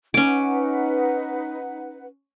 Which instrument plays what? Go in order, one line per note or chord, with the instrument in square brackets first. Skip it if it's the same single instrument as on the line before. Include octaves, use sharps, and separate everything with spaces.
[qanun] C#4 D6 [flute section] D#4 B4 F#5